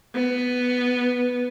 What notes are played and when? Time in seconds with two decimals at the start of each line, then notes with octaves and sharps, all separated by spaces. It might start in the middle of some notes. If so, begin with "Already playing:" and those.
0.15 B3